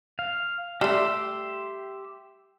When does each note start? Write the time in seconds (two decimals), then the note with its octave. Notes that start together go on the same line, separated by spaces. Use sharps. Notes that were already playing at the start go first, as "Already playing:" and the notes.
0.19 F5
0.81 G3 A3 G4 E5 C6